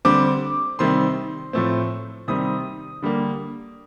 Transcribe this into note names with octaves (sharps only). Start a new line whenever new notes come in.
D3 G3 C4 D6
C3 D#3 G3 C4 C6
A2 F3 A3 C4
C3 D#3 G3 C4 D#6
D3 G3 A#3